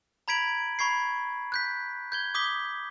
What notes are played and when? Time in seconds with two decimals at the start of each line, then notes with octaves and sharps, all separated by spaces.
0.28 A#5 B5 G#6 B6 D7 F#7
0.79 B5 C#6 G#6 C7
1.52 F#6 G6 B6
2.12 G6 G#6 G7
2.35 D6 D#6 G6 B6 G7